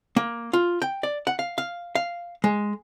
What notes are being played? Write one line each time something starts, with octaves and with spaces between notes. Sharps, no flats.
A#3
F4
G5
D5
F#5
F5
F5
F5
G#3